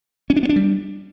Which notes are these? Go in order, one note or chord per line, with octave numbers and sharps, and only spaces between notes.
C#4
D4
B3
D4
G3